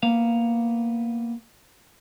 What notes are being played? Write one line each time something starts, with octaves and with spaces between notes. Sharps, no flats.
A#3 B3 F5